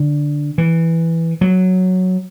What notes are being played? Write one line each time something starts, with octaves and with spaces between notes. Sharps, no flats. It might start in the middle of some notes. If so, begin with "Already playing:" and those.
Already playing: D3
E3
F#3